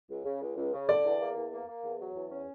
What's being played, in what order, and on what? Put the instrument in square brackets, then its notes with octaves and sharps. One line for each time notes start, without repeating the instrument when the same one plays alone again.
[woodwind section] C#2
C#3
C#2
C#2
C#3
[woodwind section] D3 [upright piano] D5
[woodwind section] E2
A#3
E2
A#3
A#3
E2
F#3
E2
C#4